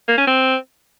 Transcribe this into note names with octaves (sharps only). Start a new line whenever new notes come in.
A#3
C#4
C4